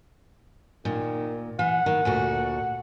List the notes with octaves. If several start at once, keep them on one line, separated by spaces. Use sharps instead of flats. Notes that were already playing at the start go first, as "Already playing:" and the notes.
A#2 D#3
E3 F#5
D#3
D2 A#2 F#4